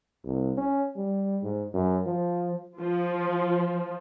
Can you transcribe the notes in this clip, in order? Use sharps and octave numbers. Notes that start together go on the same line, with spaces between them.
C2
C#4
G3
G#2
F#2
F3
F3